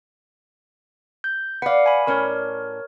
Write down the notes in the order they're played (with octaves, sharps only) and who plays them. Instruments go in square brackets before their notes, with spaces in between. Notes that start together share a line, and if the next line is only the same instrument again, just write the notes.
[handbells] G6
[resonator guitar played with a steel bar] B4 D5 [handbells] F5 F#5
[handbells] G#5 B5
[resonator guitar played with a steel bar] A2 C#4 D5 [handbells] A#4 C#5